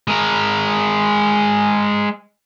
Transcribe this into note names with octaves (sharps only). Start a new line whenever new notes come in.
G#3 A#4